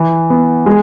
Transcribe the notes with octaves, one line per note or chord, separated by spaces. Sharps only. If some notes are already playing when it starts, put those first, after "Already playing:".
Already playing: E3
B3
G#3